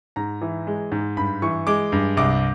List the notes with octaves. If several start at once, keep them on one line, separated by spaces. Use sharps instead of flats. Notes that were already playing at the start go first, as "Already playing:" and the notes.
G#2 A#5
E3
G#3
G#2
G2 B5
E3 C#6
G#3 D6
G2
C2 D6